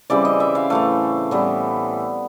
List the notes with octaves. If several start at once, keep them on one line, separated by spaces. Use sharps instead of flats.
C#3 E3 G3 C4 D5
D#5
E5
F5
A2 E3 A3 F5
A2 E3 G3 B3